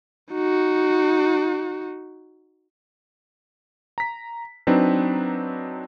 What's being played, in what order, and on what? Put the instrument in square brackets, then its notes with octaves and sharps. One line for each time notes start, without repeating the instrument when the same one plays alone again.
[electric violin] D#4 F#4
[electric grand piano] A#5 B6
F#3 C4 D4 D#4 B4